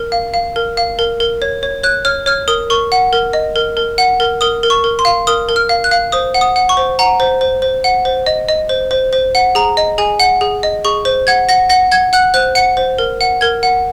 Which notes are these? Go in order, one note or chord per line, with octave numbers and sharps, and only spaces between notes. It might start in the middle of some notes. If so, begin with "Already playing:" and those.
Already playing: A#4
F5
F5
A#4
F5
A#4
A#4
C#5
C#5
C#5 F#6
C#5 F6
C#5 F6
A#4 D#6
A#4 C#6
F#5
A#4
D#5
A#4
A#4
F#5
A#4
A#4 D#6
A#4
C#6
A#4
C6
F5
A#4 D#6
A#4
F6
F5
F#6
F5
C5 D#6
F#5
D#6
F#5
C#6
C5
F#5 A#5
C5
C5
C5
F#5
C5
D#5
D#5
C5
C5
C5
F#5
G#4 A#5
D#5
G#4 G#5
F#5
G#4
D#5
G#4 C#6
C5
F#5 G#6
F#5 A#6
F#5 A#6
F#5 G#6
F#5 F#6
C5 F#6
F#5 C#7
C5
A#4
F#5
A#4 G#6
F#5